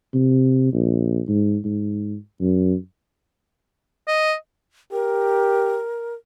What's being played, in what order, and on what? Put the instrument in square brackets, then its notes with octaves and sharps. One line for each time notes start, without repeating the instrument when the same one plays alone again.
[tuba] C3
A#1
G#2
G#2
F#2
[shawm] D#5
[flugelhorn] G4 [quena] A#4